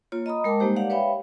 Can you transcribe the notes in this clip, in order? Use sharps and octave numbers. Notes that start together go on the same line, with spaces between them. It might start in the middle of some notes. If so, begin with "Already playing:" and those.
A#3 F4 C#5
D#5 A#5 B5 D#6
G#3 A#4 G5 A5 D6
G3 G#3 A#3 D#4 G4 C5
G4 C#5 D5 F5 F#5
B4 C#5 E5 F5 G5 B5